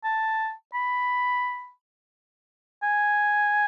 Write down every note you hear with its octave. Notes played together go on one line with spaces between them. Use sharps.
A5
B5
G#5